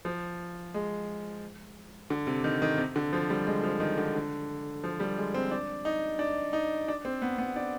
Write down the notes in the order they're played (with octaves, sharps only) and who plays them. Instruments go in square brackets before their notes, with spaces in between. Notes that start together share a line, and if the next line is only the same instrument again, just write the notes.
[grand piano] F3
G#3
D3
C3
D#3
D#3
C3
D3
F3
G3
G#3
F3
D#3
D3
D3
F3
G3
G#3
C4
D4
D#4
D4
D#4
D4
C4
B3
B3
D4